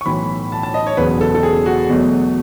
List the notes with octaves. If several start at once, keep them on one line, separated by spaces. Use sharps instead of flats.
C#6
B1 A2 E3 B5
A5
A5
D#5
C#5
E1 E2 C#3 F#3 B4
A4
A4
G#4
F#4
E2 B2 F#3 A3